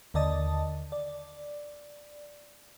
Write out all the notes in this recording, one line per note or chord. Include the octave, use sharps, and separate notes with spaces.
D#2 D3 D5 D#5 A5 D#6
D5